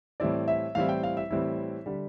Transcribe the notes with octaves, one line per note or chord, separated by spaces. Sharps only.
A2 E3 G3 C4 E4 D5
E5
A2 E3 G3 C4 E4 F5
G5
F5
E5
A2 E3 G3 C4 E4
D3 G3